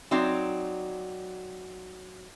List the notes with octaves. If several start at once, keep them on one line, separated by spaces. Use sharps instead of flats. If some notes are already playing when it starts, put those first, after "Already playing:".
F#3 C4 D#4 D5